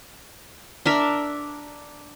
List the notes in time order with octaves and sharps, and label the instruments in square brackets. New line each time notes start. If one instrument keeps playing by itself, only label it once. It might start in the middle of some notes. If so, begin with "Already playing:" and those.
[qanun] D4 A#4 E5